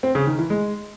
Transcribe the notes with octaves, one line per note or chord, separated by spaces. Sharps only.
C4
C#3
D#3
E3
G#3